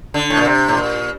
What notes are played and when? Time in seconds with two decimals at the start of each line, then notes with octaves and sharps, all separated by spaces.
0.14 D3
0.30 A2
0.37 A#2
0.46 C3
0.68 A2
0.77 A#2